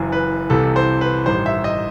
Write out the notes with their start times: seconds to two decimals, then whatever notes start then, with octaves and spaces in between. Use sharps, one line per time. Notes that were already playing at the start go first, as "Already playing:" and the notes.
Already playing: F#1 F#2 E3
0.12 B4
0.50 C2 C3 E3 A4
0.76 C5
1.01 B4
1.26 A1 G2 D#3 C5
1.46 E5
1.64 D#5